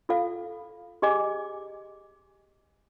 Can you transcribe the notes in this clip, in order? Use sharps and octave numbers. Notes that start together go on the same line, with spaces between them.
F4 A4 F5
G4 G#4 D#5 G#5 D6